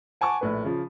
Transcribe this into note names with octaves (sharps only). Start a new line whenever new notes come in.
F#5 G#5 A5 C#6 D6
A#1 A2 B4
C#3 F3